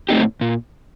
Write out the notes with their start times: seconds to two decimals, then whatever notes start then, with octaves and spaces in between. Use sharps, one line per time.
0.09 A2 A3 C4 D#4 G4
0.41 A#2